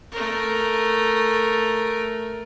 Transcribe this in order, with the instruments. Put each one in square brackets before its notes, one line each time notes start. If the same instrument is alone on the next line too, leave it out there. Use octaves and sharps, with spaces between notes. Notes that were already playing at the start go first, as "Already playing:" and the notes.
[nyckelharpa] A3 A#4